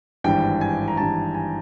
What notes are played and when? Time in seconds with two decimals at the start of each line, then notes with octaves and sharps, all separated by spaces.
0.24 G#1 G2 E3 G5
0.61 G#5
0.88 A#5
0.97 G#1 G2 E3 A5
1.34 G#5